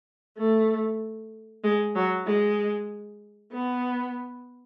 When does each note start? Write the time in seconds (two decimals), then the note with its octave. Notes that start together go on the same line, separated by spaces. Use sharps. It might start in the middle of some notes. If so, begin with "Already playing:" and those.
0.38 A3
1.64 G#3
1.96 F#3
2.27 G#3
3.52 B3